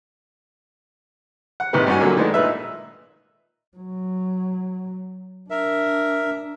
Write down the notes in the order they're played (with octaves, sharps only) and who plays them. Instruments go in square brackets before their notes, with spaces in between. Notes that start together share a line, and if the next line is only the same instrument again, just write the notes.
[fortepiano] F#5
A1 C3 D#3 B4
G2 C#4 D#4 F#4 G#5
A#2 D3 F#3 A#3
D#3 E3 G#3 A3 D4
A#2 D#4 B4 E5
[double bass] F#3
[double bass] D4 [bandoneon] A#4 E5